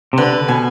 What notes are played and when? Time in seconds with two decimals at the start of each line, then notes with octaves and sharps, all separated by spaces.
0.13 C3
0.18 D3 B4
0.48 B2 G#5